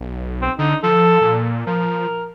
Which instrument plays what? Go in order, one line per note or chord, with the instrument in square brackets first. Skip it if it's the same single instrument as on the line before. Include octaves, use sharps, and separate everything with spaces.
[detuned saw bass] B1
[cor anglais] C4
[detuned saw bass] D3 [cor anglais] D#4
[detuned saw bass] F3 [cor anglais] A4
[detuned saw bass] A#2
[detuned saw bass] F3 [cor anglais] A#4